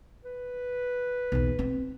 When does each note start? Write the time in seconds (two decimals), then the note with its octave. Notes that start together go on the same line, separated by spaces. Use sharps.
0.25 B4
1.32 B1 E2
1.59 C4